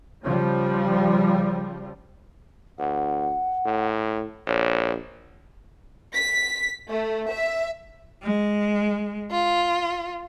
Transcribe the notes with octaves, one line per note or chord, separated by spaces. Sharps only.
C#3 F3 G3
D2 F#5
A2
A#1 C#5
B6
A3
E5
G#3
F4